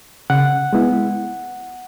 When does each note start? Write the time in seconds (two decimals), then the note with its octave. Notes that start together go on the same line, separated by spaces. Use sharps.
0.30 C#3 F#5
0.73 G#3 B3 E4